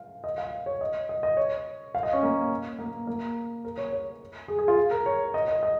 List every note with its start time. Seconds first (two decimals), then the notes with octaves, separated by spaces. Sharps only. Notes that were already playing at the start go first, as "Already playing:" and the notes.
Already playing: F5
0.24 D#5
0.38 F5
0.66 C#5
0.81 D#5
1.09 D#5
1.23 D#5
1.37 C#5
1.95 F5
2.03 D#5
2.13 C#4
2.23 A#3
2.79 A#3
3.07 A#3
3.65 A#4
3.78 C#5
3.92 C#5
4.48 G#4
4.59 G#4
4.68 F4
4.91 A#4
5.06 C#5
5.34 D#5
5.48 D#5
5.63 D#5